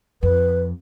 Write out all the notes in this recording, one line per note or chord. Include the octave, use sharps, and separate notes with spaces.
F2 B4